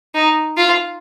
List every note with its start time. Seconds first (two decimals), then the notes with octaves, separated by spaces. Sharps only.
0.15 D#4
0.57 F4